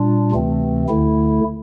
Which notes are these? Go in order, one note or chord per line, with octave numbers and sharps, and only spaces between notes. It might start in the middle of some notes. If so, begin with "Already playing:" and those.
Already playing: A#2 G3 D4 F4
D2 C3 E3 A3 C4
D2 D3 A3 E4